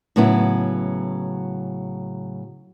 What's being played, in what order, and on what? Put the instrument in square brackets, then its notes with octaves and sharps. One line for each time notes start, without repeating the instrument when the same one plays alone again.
[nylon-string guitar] A2 C#3 F#3 B3 E4